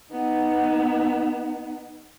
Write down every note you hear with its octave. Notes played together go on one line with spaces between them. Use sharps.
B3 D#4